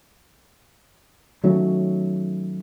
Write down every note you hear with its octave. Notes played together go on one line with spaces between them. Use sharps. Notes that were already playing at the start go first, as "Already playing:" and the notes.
D#3 F#3 A3 C#4